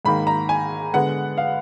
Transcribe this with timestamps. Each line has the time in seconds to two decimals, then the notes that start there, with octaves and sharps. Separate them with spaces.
0.05 G#2 D#3 A#3 B5
0.27 A#5
0.49 G#5
0.93 D3 G#3 B3 F#5
1.38 F5